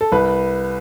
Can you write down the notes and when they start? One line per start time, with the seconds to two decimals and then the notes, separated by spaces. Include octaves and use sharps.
0.01 A4
0.12 C2 B4